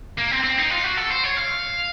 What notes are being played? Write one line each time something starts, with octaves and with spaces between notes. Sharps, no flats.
A#3
C4
C4
D#4
F4
F#4
A4
C5
C#5
F5